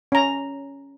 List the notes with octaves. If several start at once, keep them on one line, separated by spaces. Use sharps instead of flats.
C#4 A#5